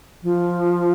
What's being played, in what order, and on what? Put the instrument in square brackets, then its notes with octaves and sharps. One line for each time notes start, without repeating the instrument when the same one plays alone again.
[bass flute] F3